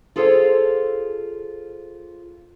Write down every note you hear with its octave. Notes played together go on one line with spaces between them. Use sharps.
F4 G#4 A4 C5 C#5 F5